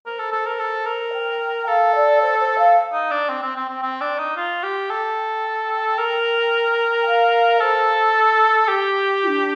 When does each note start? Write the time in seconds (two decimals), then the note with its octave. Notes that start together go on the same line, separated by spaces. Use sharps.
0.06 A#4 C5
0.19 A4
0.32 A4
0.46 A#4
0.60 A4
0.86 A#4
1.13 G5
1.67 A4 F5
1.95 D5
2.21 C5
2.39 C5
2.58 F5
2.93 D#4
3.11 D4
3.29 C4
3.43 C4
3.56 C4
3.69 C4
3.82 C4
4.01 D4
4.19 D#4
4.37 F4
4.63 G4
4.90 A4 G5
5.98 A#4
7.06 F5
7.60 A4 C5
8.68 G4
9.22 F4
9.27 D4